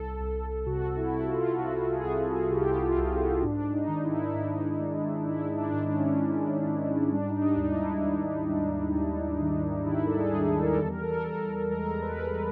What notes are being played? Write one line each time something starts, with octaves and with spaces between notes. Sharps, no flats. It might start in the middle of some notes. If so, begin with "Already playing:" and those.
Already playing: C2 A4
C2
C3 F#4
E4
C3
F4
C3 F#4
G#4
C2
G#4
C3 G4
F4
C2
G#2 D4
D#4
D#3
E4
E4
G#2 D#4
G#3
G#2 E4
D4
G#2
C#4
G#3
G#2
G3 D4
D#4
D4
D#2
D#4
E4
D#2
G3
D#2
D#3
D#3 E4
A4
G#4
G3
A4
A#4
E2 A4
A#4
A4
A#4
E2 A4
G#3 A#4
B4
G#3